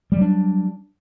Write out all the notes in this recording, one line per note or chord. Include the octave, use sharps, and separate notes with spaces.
F#3 G3 D4